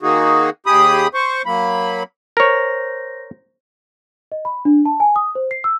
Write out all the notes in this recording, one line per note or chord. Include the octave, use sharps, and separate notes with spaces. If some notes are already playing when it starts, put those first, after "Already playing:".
D#3 A#3 D#4 F#4 G#4
D#2 G4 G#4 B5 D#6
C5 C#6
F#3 A#3 B5
A#4 C5 C#5 A#6
D#5
B5
D4
A5
G#5
D#6
C5
C7
E6